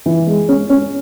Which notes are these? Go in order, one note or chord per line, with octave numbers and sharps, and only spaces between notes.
E3
G#3
C#4
C#4